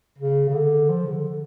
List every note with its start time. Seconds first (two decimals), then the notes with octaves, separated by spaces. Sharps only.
0.18 C#3
0.49 C#3
0.54 D3
0.90 F3
1.07 C#3
1.14 D3
1.28 D3